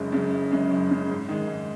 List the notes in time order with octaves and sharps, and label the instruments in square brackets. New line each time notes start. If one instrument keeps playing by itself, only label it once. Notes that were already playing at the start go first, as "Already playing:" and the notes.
Already playing: [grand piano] F#1 F#2 C#3 G#3
F#2 C#3 G#3
F#1
F#2 C#3 G#3
F#1
F#2 C#3 G#3
G#2
D#3 G#3
G#2